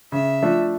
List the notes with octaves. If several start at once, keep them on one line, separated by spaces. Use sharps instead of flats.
C#3 E5
F3 A3 D4 F4